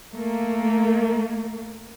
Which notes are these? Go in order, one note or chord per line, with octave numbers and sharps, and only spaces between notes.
A3 A#3